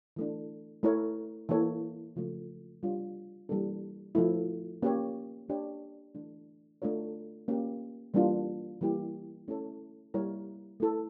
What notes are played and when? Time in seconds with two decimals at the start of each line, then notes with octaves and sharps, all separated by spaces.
0.16 E3 A3 D4
0.83 A3 E4 A#4 C#5
1.49 E3 A#3 E4 A4 C#5
2.16 C#3 F3 A3
2.83 G3 D4 F4 C#5
3.49 E3 G3 A#3 D4 A4
4.15 F3 A3 E4
4.83 A#3 C#4 G4 C#5
5.48 A#3 D4 G4 C#5
6.15 E3 A3 D4
6.82 A3 D4 F4 A#4 C#5
7.48 A#3 C#4 G4
8.14 E3 G3 A#3 D4 F4
8.81 E3 G3 A#3 E4 G4
9.48 A3 C#4 E4 A4 C#5
10.14 G3 A#3 E4 A#4 C#5
10.80 A3 E4 A4